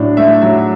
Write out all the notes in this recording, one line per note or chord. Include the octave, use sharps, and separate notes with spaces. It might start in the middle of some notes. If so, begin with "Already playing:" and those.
Already playing: A2 F#3 D4
A3 E5
F#3 E5